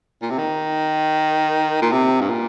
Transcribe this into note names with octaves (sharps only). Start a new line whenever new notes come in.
A#2
C3
D#3
A#2
C3
G2
A#2